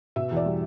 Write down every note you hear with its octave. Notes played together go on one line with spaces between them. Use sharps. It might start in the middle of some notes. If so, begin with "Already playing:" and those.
B2 E5
E2
D5
G3